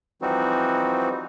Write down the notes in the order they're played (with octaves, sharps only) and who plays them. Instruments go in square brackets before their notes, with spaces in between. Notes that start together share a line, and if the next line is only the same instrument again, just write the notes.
[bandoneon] E3 F3 G3 C4 D#4 F#4